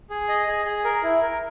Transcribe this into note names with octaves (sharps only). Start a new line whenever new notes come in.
G#4
D#5
G#4
G#4
A#4
E4
A#4